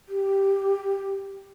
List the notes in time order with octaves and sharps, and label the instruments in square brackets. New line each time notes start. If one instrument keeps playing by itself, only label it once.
[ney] G4